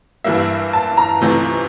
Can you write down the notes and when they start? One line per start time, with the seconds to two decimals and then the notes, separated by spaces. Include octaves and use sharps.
0.24 G2 E3 G3 A#3 E5
0.73 A5
0.97 A#5
1.21 C#2 C3 E3 A3